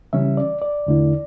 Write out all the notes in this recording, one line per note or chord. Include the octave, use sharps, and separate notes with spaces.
C#3 E3 G3 C#4 E5
D5
D5
E2 D3 A3 E4